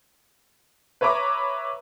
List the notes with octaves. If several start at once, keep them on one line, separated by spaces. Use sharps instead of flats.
B4 C#5 E5 A#5 D6